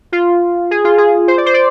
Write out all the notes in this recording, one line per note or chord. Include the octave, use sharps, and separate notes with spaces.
F4
G#4
F4
G#4
C5
D5
C5
D5